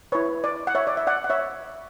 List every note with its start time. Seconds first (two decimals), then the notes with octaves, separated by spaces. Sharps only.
0.12 E4 B4 C#5
0.44 D5
0.67 F#5
0.75 C#5 E5
0.87 D5
0.97 E5
1.07 D5 F#5
1.24 F#5
1.30 C#5 E5